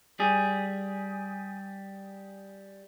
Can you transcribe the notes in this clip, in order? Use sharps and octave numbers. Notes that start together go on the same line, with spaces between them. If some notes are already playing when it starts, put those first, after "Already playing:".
G3 G#4